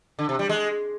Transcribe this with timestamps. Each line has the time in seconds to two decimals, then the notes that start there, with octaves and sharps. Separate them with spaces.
0.19 D3
0.29 C3
0.39 G3
0.49 G#3